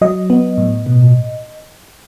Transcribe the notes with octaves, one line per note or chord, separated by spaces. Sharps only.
F#3 D#5
B3
A2
B2